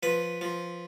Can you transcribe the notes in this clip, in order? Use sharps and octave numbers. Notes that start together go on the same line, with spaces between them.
F3 B4
F3